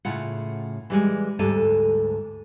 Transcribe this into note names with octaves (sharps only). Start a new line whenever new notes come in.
A2 C#3 F4 F#5
E3 G3 G#3
D2 G#2 G3 A4 G#5 A5